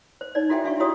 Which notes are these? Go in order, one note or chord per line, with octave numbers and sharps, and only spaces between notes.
C5
D#4 C#5 D5
E4 F#4 A4 E5 G5 G#5
D4 F#4 E5 F5 G#5 C#6
E4 F#4 G4 C#5 D#6